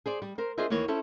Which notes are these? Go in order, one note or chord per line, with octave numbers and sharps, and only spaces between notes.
G#4 C5 D5
G3
A#4 C5
D4 F4 G#4 C5 D#5 E5
D#2 E3 A#3 C#5
C#4 E4 A4 C5